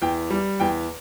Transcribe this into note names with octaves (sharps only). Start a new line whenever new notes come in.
E2 G5
G3
E2 G5